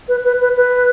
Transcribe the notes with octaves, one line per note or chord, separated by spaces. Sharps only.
B4
B4
B4
B4